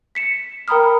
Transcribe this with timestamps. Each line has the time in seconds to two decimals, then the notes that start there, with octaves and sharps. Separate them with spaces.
0.15 B6 C#7 E7
0.68 A#4 G5 A#5 B5 D#6 F6